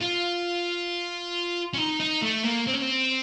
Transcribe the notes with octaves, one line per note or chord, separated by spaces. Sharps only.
F4
C#4
D#4
D#4
A3
A#3
C4
C#4
C4